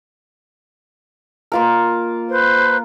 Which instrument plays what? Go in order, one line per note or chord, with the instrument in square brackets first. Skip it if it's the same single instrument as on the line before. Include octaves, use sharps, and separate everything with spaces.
[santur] A#3 F4 A#4
[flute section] B4 C5